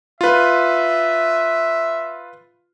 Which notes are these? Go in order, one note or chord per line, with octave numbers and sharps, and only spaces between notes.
F4 B4 E5